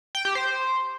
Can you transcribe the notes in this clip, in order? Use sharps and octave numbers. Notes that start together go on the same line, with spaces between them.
G5
G4
C5